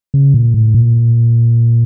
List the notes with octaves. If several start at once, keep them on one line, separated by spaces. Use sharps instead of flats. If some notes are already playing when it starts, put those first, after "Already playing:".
C#3
A#2
A2
A#2